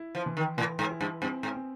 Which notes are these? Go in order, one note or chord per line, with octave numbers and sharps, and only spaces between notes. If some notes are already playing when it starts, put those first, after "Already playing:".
Already playing: E4
F3
E3
D#3
A2 E3
G#2
E4
G2
G2 C4
G#2
C4